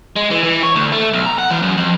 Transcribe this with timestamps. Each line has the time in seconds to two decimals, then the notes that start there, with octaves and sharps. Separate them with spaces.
0.16 G#3
0.31 E3
0.44 E3
0.63 C#5
0.76 D2
0.92 A3
1.13 B1
1.26 A#5
1.38 F#5
1.51 E3
1.62 F#2
1.78 F2